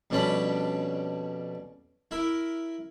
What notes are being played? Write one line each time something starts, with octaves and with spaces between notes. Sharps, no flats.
F2 B2 G3 C#4 D4 B5
E4 A#4 E5